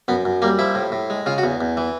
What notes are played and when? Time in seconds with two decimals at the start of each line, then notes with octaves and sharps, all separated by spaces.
0.08 F#2 B3
0.25 F#2
0.42 G3 A#3
0.59 F3 E4
0.75 A2
0.92 A2
1.10 G#3
1.26 C#3 F4
1.38 F#4
1.44 E2
1.61 E2
1.77 E3